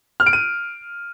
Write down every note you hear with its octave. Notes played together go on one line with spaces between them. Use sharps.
F6
D7
D#7